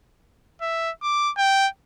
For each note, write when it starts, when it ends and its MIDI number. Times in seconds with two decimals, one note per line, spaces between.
0.61 0.91 76
1.03 1.31 86
1.38 1.68 79